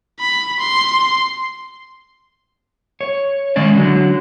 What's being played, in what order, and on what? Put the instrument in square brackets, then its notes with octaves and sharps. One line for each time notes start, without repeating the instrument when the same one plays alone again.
[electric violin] B5
C6
[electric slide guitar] C#5
D#3 G#3 C#4 D5
D3 F#3